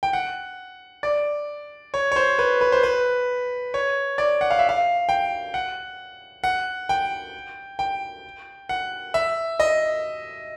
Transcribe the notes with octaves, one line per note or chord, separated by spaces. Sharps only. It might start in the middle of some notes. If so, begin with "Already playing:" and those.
G5
F#5
D5
C#5
C#5
C5
B4
B4
C5
B4
C#5
D5
F#5
F5
E5
F5
G5
F#5
F#5
G5
G5
F#5
E5
D#5